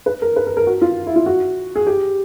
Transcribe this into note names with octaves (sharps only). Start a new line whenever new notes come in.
B4
A#4
B4
A#4
A#4
F#4
F4
E4
F4
F#4
G#4
G4